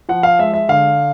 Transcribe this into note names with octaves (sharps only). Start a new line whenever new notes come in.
F3 F#5
F5
G#3 E5
E5
D3 F5